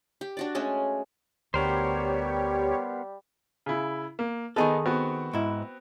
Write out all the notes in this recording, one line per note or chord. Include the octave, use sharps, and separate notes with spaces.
G4
D4 F#4 D5
G#3 A3 C#4 G#4
D2 G3 B3 G4 A#4 C5 C#5
C#3 E4
A#3
D#3 B3 D#4 G#4 A4
B3 C4 F#4
G#2 E4